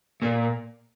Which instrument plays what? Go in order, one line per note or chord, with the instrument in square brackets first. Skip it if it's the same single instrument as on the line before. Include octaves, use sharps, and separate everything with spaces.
[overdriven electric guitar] A#2